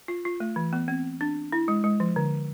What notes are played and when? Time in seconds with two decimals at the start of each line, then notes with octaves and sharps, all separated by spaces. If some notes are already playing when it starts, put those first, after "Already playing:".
0.08 F4
0.25 F4
0.40 A3
0.56 E3
0.73 B3
0.88 C4
1.21 D4
1.52 E4
1.68 G#3
1.84 G#3
2.00 F3
2.16 D3